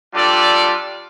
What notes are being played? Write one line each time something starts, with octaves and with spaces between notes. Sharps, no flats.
G3 D4 F4 A4 D5